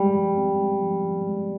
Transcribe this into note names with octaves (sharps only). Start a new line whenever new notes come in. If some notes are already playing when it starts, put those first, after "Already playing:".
Already playing: G3 G#3
F3
C4
G#3
F3
F3
G#3